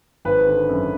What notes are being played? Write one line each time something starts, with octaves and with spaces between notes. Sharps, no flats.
G#1 B4
D3
F#2